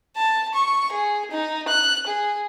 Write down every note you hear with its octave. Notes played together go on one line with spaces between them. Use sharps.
A5
C#6
G#4
D#4
F#6
G#4